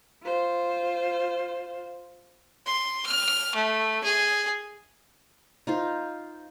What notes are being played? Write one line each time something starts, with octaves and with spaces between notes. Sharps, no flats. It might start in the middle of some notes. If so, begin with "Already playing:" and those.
F4 C5
C6
F6
A3
G#4
D#4 F4 C5